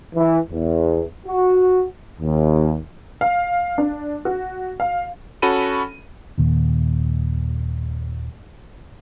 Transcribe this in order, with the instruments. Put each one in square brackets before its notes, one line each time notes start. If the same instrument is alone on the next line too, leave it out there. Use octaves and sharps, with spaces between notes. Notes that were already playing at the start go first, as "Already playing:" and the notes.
[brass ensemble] E3
E2
F#4
D#2
[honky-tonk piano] F5
D4
F#4
F5
[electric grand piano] C#4 F#4 A4 B5 D#7
[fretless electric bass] D#2 A#2 D#3